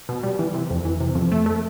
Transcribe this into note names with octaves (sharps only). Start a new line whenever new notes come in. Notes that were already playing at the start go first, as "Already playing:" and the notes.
B2
G3
E3
C3
F2
E3
C3
F2
A3
A3